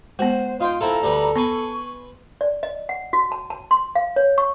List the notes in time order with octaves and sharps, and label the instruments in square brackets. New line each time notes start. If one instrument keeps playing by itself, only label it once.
[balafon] G#3 B3 [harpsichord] F#4 [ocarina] C5
[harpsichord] D#4 G5 [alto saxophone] F4 [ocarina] C6
[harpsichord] C4 E4 F4 [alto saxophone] A4 [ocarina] A#5
[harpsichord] D2 G3 B4
[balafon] B3 [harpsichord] B4 G#5 C6 [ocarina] C#6
[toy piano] D5
D#5
F#5
F#4
A5
A5
C6
F5
C#5
C#6